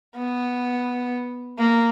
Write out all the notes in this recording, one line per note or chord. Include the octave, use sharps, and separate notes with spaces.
B3
A#3